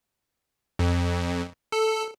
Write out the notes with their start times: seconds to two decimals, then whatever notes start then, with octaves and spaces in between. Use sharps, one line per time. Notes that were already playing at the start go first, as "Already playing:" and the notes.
0.79 F2
1.72 A4